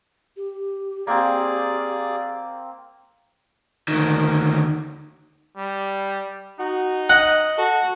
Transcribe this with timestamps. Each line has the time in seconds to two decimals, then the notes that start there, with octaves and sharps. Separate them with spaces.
0.37 G4
1.07 A#3 C4 G#4 D5
3.88 D2 D#3
5.58 G3
6.60 D#4 F#4
7.10 D#5 F#5
7.58 F#4 A4